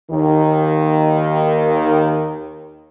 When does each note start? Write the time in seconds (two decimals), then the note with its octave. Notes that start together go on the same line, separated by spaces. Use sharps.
0.11 D#2 D#3